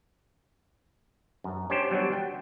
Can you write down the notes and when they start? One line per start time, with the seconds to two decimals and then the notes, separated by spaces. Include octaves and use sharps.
1.44 F#2
1.70 C#4 D4 G4 C5
1.91 F#3 G3 B3 D4
2.13 G5